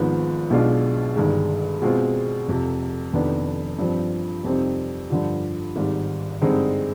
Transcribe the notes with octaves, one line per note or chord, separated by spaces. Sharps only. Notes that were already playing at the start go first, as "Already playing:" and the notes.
Already playing: G#1 G#2 F3 B3
B1 B2 G#3 D4 F4
G1 G2 D#3 G#3
B2 G#3 C4 F4
F1 F2 C3
F1 F2 D#3 B3 D4
G2 F3 C4
F2 C3 G3 C4 D#4
G2 D3 F3
G#1 G#2 G3
G2 D3 G#3 C4 D#4